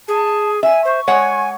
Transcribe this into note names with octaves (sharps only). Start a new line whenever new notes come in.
G#4 A5
E5 G#5
C5 C#6
G#3 C#5 F#5 G#5